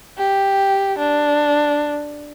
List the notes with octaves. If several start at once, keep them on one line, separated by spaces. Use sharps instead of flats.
G4
D4